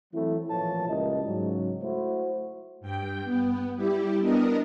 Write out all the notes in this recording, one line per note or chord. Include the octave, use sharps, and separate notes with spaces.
E3 F#3 A3 C4 E4
A1 A#2 E3 F3 C#5 A5
C#2 A#2 G3 E4 A#4 D#5
G#2 C#3 F#3
A3 E4 F#4 C5
G2 G5
B3
G3 E4 G4
B3 D4 A#4 D#5